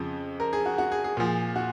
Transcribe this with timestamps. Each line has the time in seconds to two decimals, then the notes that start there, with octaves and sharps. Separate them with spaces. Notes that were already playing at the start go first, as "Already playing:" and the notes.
Already playing: F2 C#3 F3
0.40 A#4
0.53 G#4
0.66 F#4
0.78 F#4
0.92 G#4
1.04 G#4
1.17 A#2 F3
1.56 F#4